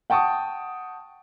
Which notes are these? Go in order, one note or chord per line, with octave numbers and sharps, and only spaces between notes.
F#5 G5 A5 C#6 D#6